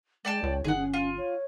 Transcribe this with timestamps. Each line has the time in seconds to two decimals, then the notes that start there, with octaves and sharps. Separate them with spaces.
0.25 G#3 D5 G5 A5
0.43 C#2 C#5
0.64 G1 D#3 G#4 F#5
0.76 C#4
0.94 F4
1.18 C#5